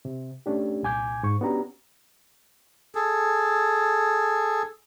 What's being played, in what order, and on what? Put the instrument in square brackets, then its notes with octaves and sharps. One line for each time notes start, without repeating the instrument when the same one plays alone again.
[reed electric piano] C3
A3 C#4 D4 G4
C2 A#2 G#5 D6 G6 G#6
G#2 C#6
B3 C#4 D4 F#4 G4 A#5
[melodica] G#4 A4